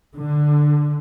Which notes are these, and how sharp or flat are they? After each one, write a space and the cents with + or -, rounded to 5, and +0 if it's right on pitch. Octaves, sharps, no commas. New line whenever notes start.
D3 +10